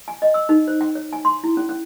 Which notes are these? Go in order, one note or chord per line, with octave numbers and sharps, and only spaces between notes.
G#5
D#5
E6
D#4
C5
G5
C#5
G#5
C6
E4
C#4
C#4